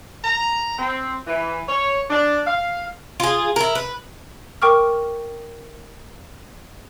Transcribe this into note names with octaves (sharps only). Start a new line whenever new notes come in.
A#5
C4
E3
C#5
D4
F5
F4 G#4
E4 A#4
B4
A#4 G5 C#6 D6 F6